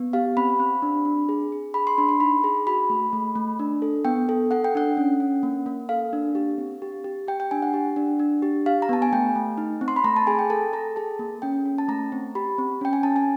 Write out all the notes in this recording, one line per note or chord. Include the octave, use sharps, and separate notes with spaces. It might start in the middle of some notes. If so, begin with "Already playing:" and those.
Already playing: B3
G4 F5
C4 B5
C4
D4
D4
G#4
G#4
G#4 B5
C6
D4 B5
C6
D#4 B5
G#4
F#4 B5
A3
A3
A3
D4
A4
B3 G5
A4
A4 F#5
G5
D4 F#5
C#4
C#4
A#3
A#3
A4 F5
D4
G4
C4
G4
G4
G4 G5
G5
D4 G#5
F#5
G4
D4
D4
G4
G4 F5
A#5
B3 A5
G#5
A3 G5
A3
D#4
C4
C6
B5
A3 A#5
A5
G#4 G#5
G5
A4 A5
A4 A#5
G#4 A5
A#3
C#4 G5
C#4
A5
A3 A#5
C4
G4 B5
C4
C#4 G5
G#5
C#4 A5
G#5